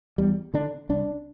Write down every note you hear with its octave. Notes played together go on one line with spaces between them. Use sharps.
E2 G3
D3 D4
C2 D4